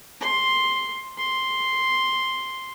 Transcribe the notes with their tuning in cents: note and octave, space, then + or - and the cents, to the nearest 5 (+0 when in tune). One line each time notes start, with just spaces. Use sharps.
C6 +5
C6 +0